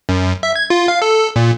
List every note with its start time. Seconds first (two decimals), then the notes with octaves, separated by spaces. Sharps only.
0.09 F#2
0.43 E5
0.56 G#6
0.70 F4
0.88 F5
1.02 A4
1.36 A#2